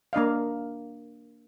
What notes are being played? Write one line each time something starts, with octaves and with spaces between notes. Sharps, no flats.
A#3 D4 D#5 F5